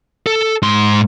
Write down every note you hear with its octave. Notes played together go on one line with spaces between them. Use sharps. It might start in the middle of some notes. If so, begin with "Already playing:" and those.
A4
G#2 C6